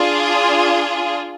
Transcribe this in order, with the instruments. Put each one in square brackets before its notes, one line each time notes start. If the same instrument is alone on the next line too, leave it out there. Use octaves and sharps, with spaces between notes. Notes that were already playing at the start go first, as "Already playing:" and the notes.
Already playing: [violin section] D4 F4 G#4